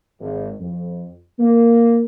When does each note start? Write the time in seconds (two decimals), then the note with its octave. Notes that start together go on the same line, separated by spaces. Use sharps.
0.20 G#1
0.59 F2
1.39 A#3